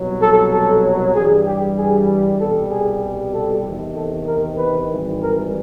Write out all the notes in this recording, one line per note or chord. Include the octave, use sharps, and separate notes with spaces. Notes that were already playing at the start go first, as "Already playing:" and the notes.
Already playing: C2 B2 F#3
A4
A4
G2 E3 G3 G#4
G4
G#4
C2 B2 G3 A4
G#4
A4
E2 C3 D#3
A4
A#4
B4
G#1 G#2 E3 G3
A#4